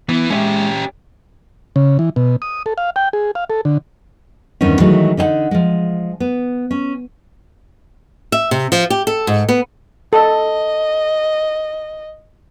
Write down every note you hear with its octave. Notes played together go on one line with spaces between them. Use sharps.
E3 B3
G#3 C#4 G4 E5
C#3
E3
B2
D#6
A4
F5
G5
G#4
F5
A4
D3
E2 G2 D#3 C4 C#4
D#3 E3 F#3 G#3 A3
D3 D#4 D5 F#5
F3 G#3
B3
C#4
E5
C3
F3
G4
A4
G#2
B3
A4 D#5